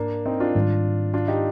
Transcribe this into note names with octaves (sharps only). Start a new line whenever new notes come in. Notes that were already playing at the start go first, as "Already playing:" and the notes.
Already playing: G#2 A#3 D4
C4 D#4
D4 F4
G#2 D#3 G3
D4 F4
D#4 G4